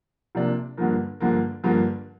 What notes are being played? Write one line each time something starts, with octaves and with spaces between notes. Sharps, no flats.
C3 F3 A#3 D4
G2 D3 F3 A#3
G2 D3 F3 A#3
G2 D3 F3 A#3